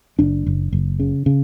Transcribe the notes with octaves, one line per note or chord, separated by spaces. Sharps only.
F#1 D4
F#1
F#1
C#3
C#3